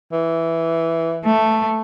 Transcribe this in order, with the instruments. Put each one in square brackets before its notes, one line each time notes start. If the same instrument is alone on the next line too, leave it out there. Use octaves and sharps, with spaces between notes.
[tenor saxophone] E3
[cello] A3